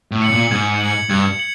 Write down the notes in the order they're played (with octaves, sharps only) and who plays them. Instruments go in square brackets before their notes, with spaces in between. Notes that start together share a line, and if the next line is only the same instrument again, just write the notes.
[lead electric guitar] A2
[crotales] C#7 F#7
[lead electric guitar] A#2
[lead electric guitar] G#2 [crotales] G#6
[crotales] C#7 F#7
[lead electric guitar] G2 [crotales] G#6
[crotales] C#7 F#7